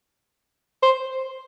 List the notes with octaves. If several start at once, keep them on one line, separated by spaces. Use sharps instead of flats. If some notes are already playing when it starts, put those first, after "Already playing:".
C5